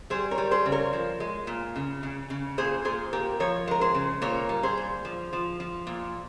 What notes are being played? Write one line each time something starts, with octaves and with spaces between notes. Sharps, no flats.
G3 G#4 C5
A#4 C#5
G3
G#4 C5
C#3
A#4 C#5
F3
G#3
A#2
C#3
C#3
C#3
A#2 G#4 C5
A#2 G#4 C5
A#2 G4 A#4
F3 A#4 C#5
G#3 A#4
G#4 C5
C#3
A#2 A#4 C#5
G3
G#4 C5
A#2
F3
F3
F3
A#2